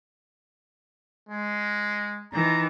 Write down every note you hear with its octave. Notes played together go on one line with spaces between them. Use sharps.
G#3
D#3 E3 A#5